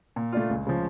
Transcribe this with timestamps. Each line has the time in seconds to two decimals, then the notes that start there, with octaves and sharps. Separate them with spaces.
0.16 A#2
0.33 A3 D4 F4
0.49 C#2
0.67 C#3 F3